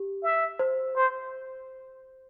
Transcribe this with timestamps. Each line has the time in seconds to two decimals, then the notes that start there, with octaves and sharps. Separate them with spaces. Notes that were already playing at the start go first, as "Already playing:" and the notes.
Already playing: G4
0.23 E5
0.59 C5
0.96 C5